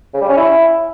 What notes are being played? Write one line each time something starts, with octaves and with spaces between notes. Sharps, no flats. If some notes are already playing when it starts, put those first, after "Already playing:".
C#3
G3
C#4
E4